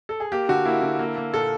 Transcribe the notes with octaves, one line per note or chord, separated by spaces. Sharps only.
A4
G#4
A#3 G4
D3 F#4
A#3 E4
D3
A#3
A#3
A#2 A4